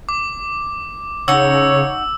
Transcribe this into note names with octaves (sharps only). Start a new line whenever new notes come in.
D6
C#3 D#4 F#4 C#5 E6